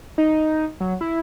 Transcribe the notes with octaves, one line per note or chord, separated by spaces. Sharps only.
D#4
F#3
E4